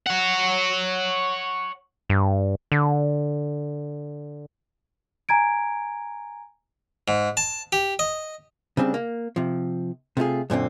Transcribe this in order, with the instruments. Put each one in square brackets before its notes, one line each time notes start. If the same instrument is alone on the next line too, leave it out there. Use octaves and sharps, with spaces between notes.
[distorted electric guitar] C#5 F#5
[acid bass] G2
D3
[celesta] G#5 A#5 G#6 D7
[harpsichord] G#2
A5
G4
D#5
[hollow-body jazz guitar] C#3 G3 C4 D4
A#3
C3 F3
C3 A3 F4 G#4
F#2 A#2 D3 C4